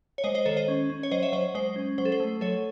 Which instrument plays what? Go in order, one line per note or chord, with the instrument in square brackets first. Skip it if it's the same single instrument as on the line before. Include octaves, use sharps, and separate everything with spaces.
[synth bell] C#5
G#3 C5 D#5
C5 D#5
D#3 A4 C#5
C5 D#5
C#4
C#4
C#5
F#3 C5 D#5
C#5 E5
F#3 C5 D#5
G#3 C5
C#4
F#3 C5
A4
C5
A3
F#3 A4 C#5